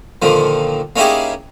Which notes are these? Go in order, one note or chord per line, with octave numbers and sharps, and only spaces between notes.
A#2 D3 D#3 F3
A#3 C#4 D#4 E4 G4 G#4